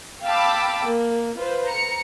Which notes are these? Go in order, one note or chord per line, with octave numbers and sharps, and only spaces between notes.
F5 G5 A5 B5 D6 E6
A#3
F4 B4 C5
A#5 C#7